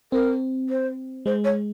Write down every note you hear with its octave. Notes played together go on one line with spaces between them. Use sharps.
C4 A#4
C5
G#3 C5
C#5